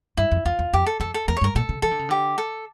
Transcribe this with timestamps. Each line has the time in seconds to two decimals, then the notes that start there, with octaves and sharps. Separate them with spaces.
0.17 G2 E4
0.31 F2
0.45 E2 F4
0.59 E2
0.73 F2 G4
0.86 A4
1.00 F2 A4
1.14 A4
1.28 E2 A#4
1.37 C#5
1.41 G2
1.44 A#4
1.55 A#2 A4
1.69 C#3
1.82 E3 A4
1.91 D3
1.99 C#3
2.09 D3 G4
2.38 A4